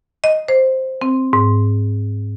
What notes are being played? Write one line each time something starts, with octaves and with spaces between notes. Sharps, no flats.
D#5
C5
C4
G#2